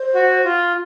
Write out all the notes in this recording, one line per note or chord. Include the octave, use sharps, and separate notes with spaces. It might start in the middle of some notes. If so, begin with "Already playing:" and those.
Already playing: C5
F#4
F4